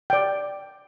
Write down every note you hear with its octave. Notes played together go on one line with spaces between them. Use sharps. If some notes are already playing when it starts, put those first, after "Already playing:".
D5 G5